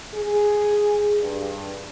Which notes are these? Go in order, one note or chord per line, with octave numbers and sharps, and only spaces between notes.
G#4
G2